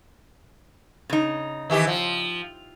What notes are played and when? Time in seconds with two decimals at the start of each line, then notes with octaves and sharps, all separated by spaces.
1.10 C#3 D#4
1.70 D#3 E3 G4
1.87 F3